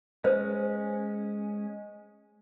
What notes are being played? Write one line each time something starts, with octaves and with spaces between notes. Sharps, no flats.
G#3 C#4 B4 C5 D#5